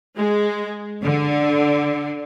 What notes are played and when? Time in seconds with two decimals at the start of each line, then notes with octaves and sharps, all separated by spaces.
0.16 G#3
1.03 D3